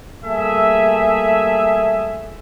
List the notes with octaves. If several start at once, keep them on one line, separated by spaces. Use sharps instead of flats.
G3 A3 A#3 G#4 E5